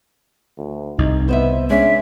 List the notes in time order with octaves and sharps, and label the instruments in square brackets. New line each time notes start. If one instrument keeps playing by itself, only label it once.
[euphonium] D2
[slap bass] C2 [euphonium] D#4
[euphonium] B3 [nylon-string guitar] C5 D#5 E5
[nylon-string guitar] G#3 D4 [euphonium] C#4 [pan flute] E5